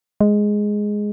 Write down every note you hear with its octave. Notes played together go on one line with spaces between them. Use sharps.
G#3